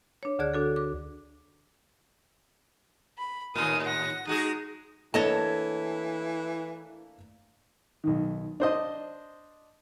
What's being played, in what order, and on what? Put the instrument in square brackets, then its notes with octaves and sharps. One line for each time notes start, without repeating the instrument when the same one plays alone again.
[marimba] D4 C#5
D2 D3 G#4 D5 F#6
D4 F#4 A4
D6
[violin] B5
[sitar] D#2 A2 [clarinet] A#4 [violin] G#5 D#6
[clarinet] F#5 [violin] A#6
[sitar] G#3 F#4 G#4 [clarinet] D#4 [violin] D#6 A#6
[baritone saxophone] E3 [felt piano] A3 A#3 D4 [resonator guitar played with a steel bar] C#5 D#5 A5
[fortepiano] B1 D#3
D4 C5 D#5